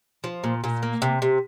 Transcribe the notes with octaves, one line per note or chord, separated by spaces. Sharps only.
F3
A#2
A#2
A#3
C3
C3